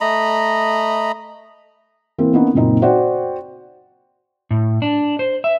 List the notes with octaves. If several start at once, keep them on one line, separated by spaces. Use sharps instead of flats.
A3 D#5 A#5 B5
E3 A#3 C4
A#3 B3 C#4 D#4
F#1 A#2 C4 D#4
F#4 C5 D5 F#5 G5
A2
D4
C5
E5